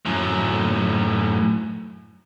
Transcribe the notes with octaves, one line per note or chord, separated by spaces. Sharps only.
F#2 A2